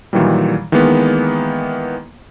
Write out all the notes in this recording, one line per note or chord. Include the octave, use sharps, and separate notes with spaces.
A#2 D#3 E3 F#3 G3
D#3 E3 G#3 A#3 B3